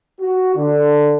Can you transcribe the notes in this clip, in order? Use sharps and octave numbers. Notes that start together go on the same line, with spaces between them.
F#4
D3